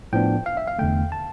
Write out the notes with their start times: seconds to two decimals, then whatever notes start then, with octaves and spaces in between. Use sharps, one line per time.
0.13 A2 F3 B3 D4 G5
0.46 F5
0.57 E5
0.67 F5
0.79 E2 D3 A3 G5
1.12 A5